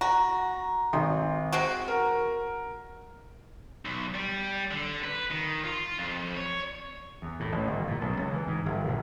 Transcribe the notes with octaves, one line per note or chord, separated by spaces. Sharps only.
F#4 A#5
G#1 C6
G#3 C4 F#4
A#4
B1
G3
D3
B4
D#3
F4
F2
C#5
E2
A2
A1
G1
A#2
B1
C#2
E3
G#2
G1
A#1